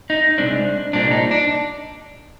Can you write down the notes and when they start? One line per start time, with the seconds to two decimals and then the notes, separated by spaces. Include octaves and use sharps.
0.10 D#4
0.38 C2 A#2 G#3 C4 D4
0.93 C2 A#2 G#3 C4 D4
1.12 D#4
1.31 D4